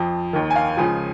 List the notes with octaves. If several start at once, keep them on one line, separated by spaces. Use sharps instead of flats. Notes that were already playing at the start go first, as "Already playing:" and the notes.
Already playing: F2 F3
D#2 D#3
G#5
F5
C#2 C#3 F3 G#5